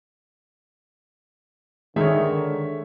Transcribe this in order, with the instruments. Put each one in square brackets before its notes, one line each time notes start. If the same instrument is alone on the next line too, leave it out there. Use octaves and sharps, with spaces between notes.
[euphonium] D3 [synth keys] D#3 [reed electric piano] G#3 [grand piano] C#5 E5